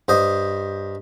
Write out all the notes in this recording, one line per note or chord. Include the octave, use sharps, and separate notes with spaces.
G2 C5 D#5